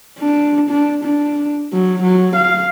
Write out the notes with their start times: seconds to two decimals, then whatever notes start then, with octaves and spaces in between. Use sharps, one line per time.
0.19 D4
0.70 D4
1.04 D4
1.73 F#3
2.03 F#3
2.36 F5